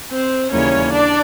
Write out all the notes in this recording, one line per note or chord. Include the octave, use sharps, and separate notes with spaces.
C4 C5
D#2 C#3 E3 G3 A#3 C#4 C#5
D4 D5